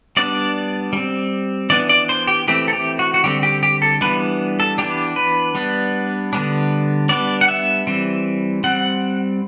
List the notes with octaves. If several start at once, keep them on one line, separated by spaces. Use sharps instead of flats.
G3 B3 D4 D5
G3 C4
E3 B3 D4 D5
D5
C5
G4
E3 A3 C4 G4
A4
G4
F#4
F#4
D3 G3 C4 G4
G4
G4
A4
E3 G3 B3 D4 B4
A4
E3 B3 D4 G4
B4
G3 B3 D4
D3 G3 B3 D4
G3 B3 D4 D5
F#5
E5
E3 G3 C4
G3 C4 F#5